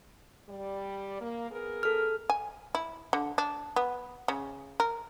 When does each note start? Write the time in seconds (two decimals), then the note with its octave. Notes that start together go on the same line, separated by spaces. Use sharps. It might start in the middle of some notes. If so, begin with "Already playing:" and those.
0.49 G3 D5
1.21 A#3
1.50 B3 G#4 A#4
1.83 A4 F6
2.30 G#5
2.75 E4
3.13 D3
3.38 D4
3.76 B3
4.28 C#3
4.80 A#4